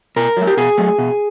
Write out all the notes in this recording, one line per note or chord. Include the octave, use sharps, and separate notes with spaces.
B2 A#4
F#3 A3
G4
B2 G#4
F#3 A3
B2